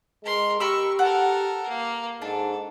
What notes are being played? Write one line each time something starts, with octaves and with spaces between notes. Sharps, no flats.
G#3 A#4 C6
G4 A#4 B5 C#6 E6
A4 A#4 F#5
A#3
G#2 D4 A4